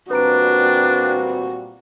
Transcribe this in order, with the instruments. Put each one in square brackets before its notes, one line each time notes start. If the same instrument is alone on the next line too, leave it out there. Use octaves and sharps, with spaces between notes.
[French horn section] A#2 G3 C4 [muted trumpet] D4 [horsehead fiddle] F#4 [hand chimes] B4 A#5 D7